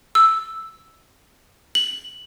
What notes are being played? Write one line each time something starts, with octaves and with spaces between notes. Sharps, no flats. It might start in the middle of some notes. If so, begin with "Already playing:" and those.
E6
F#7